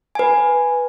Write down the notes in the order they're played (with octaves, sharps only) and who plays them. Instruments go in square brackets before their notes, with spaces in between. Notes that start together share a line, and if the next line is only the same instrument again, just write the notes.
[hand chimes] B4 G#5